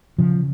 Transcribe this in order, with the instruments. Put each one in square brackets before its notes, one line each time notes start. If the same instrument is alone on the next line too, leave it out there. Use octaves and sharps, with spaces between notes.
[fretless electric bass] C#3 F3